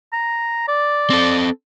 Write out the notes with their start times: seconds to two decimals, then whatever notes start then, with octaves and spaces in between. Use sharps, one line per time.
0.13 A#5
0.68 D5
1.10 C4 A4